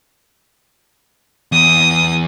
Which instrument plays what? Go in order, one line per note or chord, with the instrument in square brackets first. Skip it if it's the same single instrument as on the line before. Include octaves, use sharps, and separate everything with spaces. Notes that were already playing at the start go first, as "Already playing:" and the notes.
[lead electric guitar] E2 [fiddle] D#6